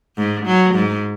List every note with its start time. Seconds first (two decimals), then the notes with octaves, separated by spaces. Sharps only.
0.17 G#2
0.46 F#3
0.75 G#2